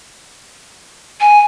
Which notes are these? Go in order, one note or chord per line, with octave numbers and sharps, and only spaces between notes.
G#5